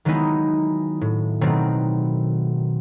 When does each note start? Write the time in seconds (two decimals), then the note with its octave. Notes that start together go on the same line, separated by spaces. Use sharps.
0.05 D#3 F#3 G#3 B3 D#4 E4
1.01 A2
1.41 B2 D#3 F#3 A3 C4